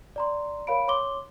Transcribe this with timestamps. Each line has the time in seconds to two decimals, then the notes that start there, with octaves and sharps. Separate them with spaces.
0.16 D5 A#5 C6
0.67 A#4 C#5 F5 B5 D7
0.88 C#5 C6 D6 G7